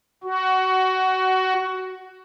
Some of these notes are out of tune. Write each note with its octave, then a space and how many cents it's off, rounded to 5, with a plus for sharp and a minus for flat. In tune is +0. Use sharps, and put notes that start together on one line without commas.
F#4 +15